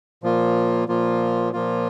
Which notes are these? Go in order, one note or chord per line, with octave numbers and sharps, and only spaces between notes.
A#2 F3 A#3 F4
A#2 F3 A#3 F4
A#2 F3 A#3 F4